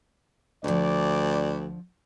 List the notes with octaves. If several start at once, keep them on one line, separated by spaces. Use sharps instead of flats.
D2 D3 F3 D5